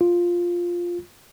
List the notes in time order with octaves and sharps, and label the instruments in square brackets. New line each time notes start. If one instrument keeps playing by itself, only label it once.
[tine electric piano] F4